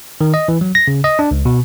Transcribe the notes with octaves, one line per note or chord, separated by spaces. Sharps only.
D#3
D#5
E3
F#3
A#6
C#3
D#5
D4
C#2
B2